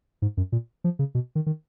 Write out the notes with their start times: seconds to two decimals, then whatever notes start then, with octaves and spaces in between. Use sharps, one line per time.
0.22 G#2
0.37 F#2
0.52 A#2
0.84 F3
0.99 C#3
1.15 B2
1.35 D#3
1.46 D#3